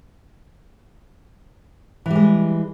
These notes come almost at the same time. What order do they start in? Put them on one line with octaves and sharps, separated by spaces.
E3 G3 G#3